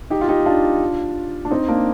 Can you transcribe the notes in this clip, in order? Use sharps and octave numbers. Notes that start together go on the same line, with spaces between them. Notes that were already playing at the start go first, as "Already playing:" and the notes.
D#4 G4
F4
D#4 G4
D4 F4
D4
C4 D#4
A#3 D4